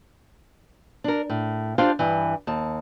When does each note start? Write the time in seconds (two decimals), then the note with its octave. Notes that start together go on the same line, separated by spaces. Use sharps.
1.04 D4 A#4
1.30 A2
1.78 D4 F4 G4 C5 F5
1.99 G2 E3
2.47 D#2 A5